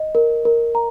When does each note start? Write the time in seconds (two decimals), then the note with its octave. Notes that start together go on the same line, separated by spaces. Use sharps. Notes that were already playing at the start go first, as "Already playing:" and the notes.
Already playing: D#5
0.15 A#4
0.45 A#4
0.75 A#5